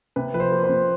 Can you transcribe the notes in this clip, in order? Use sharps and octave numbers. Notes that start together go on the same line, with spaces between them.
C3 B4
F3 B4
C5
A#3
C5
C3